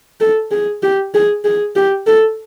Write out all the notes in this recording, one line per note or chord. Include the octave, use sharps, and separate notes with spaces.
A4
G#4
G4
G#4
G#4
G4
A4